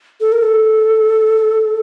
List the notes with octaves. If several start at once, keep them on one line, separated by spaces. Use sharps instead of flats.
A4
A#4
A4